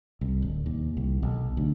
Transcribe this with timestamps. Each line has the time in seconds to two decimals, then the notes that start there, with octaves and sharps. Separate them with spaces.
0.21 C2
0.42 D1
0.66 D#2
0.97 C2
1.22 B1
1.57 D2